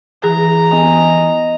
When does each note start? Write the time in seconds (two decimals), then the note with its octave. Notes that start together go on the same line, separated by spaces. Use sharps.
0.24 E3 G#4 A#5
0.71 B3 D#5 G#5